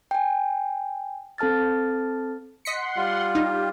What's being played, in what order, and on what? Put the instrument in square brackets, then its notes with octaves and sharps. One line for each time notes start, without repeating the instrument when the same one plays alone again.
[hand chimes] G5 G#5
C4 A4 A5 F6 A6
[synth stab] D#5 B6 C#7 [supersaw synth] F#5 C6
[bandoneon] G3 F4
[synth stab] D#4 [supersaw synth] G4